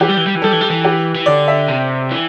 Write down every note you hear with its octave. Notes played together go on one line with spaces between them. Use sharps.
E3 G4
G3
E3
G3
E3
G3 A4
E3
G3
E3
G4
E3
D3 D5
E5
C3
E3